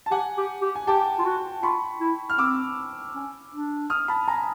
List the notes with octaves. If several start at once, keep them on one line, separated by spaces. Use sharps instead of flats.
A5
G4 F#5 G#5
G4
G4
G#5
G4 G5 A5
F4
F#4
F4 B5 C#6
E4
F6
C4 D6 E6
C#4
D4
D#6 F6
A5 B5
G#5 A#5